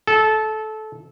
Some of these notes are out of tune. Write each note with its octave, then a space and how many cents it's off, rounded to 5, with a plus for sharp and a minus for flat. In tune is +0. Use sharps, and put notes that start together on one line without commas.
A4 -20